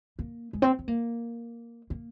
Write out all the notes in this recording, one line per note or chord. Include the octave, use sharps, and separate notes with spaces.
A#3
G#3
C4
C4
A#3
A#3